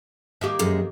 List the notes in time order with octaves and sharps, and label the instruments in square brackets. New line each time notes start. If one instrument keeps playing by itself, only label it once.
[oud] D#3 A#3 G4
[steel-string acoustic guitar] F#2 G#3